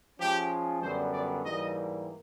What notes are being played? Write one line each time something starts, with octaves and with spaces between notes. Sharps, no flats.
F3 G#3 C#4 G4
F#2 D3 G3 B3 C5
D5
G#2 E3 G3 A#3 D#5